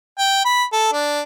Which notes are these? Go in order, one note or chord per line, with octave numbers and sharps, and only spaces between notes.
G5
B5
A4
D4